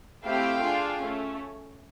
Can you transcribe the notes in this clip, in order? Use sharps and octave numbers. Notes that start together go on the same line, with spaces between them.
A3 C4 E4 G4 F5 G5
D4 F4 G#4
A3 C#4